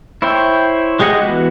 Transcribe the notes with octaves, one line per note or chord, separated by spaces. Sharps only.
E4 C5 C#5 E5 G5
G#3 G4 G#4 D#5 F#5
E3 B3 F#4